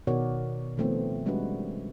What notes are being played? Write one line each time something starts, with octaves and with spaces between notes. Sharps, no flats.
B2 D#3 F#4 A#4 C#5 D5
D#3 F3 A3 B3 C4
G3 G#3 C#4 D4 F#4 B4